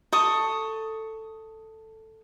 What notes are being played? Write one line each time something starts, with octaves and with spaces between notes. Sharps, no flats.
A4 C#6 D#6